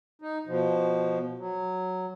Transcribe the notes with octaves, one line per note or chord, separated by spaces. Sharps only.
D#4
B2 F3
F#3